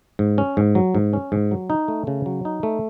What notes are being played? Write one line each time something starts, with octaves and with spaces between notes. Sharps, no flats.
G#2
C#4
G#2
F#3
G#2
C#4
G#2
F#3
D#4
A3
C#3
F#3
D#4
A3